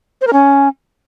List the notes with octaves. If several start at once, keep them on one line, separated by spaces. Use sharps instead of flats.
C5
A#4
C#4